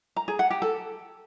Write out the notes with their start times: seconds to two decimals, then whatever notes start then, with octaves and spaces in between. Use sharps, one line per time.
0.16 A#5
0.28 G#4
0.39 F#5
0.50 G4
0.62 A4